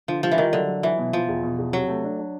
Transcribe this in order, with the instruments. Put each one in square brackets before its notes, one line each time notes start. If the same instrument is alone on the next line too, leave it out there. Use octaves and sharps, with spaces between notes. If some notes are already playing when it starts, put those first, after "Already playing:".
[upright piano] D3 [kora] F3
[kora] F3 [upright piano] G3
[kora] E3
[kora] D#3 [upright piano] G3
[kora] D3 [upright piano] F#3
[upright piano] F#3
[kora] E3 [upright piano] F#3
[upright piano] B2
[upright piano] B2 [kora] F3
[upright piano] E2
B2
E2
[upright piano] C3 [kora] F#3
[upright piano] A3
D4
D4